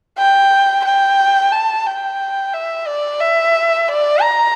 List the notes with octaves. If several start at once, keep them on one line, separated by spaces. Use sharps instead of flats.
G5
G5
A5
G5
E5
D5
E5
D5
A#5